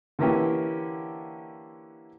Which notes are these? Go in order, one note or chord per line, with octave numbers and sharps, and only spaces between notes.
D3 E3 A#3 C#4 E4 G4